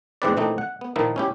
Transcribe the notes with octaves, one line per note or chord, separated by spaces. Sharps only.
E2 G#2 E3 C4 B4 D5
A#2 E3 A3 C4 D4 D#4
F#5
B3
A#2 D#3 F3 A#3 D#4 E4
C#4 E4 G4